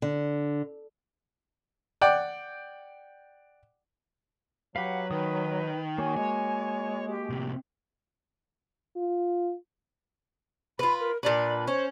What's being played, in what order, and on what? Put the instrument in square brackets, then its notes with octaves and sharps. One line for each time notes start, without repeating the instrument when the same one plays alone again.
[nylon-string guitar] D3
[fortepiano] D5 F#5 G5
[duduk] F#3 [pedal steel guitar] G4 F5 [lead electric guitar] B4 [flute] F#5
[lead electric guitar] D#3 [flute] B4 [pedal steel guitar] D#6
[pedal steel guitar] A#3 F#4 [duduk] C#5 [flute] G#5
[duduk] G#3 [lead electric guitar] C#5
[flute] G4
[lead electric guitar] A2 C3
[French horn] F4
[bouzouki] F4 B4 [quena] B5
[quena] A#4
[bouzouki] A#2 D4 B4 [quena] D5
[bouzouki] C#4 [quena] C5